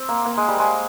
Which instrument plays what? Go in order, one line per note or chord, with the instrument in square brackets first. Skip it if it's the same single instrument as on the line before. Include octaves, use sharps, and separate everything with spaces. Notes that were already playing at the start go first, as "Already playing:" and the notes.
Already playing: [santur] C4
A#3
A#3
G#3
G3
G#3